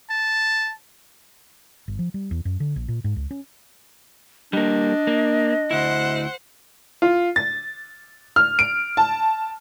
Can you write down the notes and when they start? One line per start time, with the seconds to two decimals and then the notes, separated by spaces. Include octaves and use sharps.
0.10 A5
1.88 G1
1.99 F3
2.14 G3
2.31 E2
2.45 F#2
2.60 D3
2.76 A#1
2.88 A#2
3.04 G#2
3.16 C#2
3.31 C#4
4.53 G3 A#3 D4 D#5
5.07 A#3
5.71 D2 E4 C5 F#5
7.02 F4
7.36 A6
8.36 F6
8.59 D7
8.97 A5